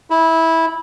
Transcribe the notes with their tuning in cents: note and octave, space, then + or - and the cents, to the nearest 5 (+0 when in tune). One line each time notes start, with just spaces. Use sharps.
E4 -15